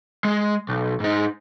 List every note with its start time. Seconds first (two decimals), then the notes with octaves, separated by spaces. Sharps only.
0.25 G#3
0.69 B1
1.00 G#2 D#4